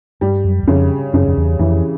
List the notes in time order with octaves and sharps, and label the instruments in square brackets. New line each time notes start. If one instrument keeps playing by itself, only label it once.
[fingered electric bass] G2 [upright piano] G3
[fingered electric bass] F#2
E2
[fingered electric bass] F2 [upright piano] C#3
[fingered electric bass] F#2 [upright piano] C#3
[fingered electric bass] F2
E2
[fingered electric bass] F2 [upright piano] E3